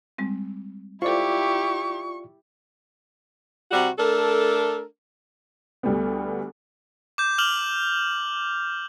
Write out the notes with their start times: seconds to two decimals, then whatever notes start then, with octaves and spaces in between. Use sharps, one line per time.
0.18 G3 G#3 C4
1.02 E4 F4 G4 A4 C5 D5 C#6
3.72 C3 G3 F#4
3.99 A3 D4 A4 A#4
5.83 D2 G3 A3 B3
7.18 D6 G6
7.38 D6 F6 F7 F#7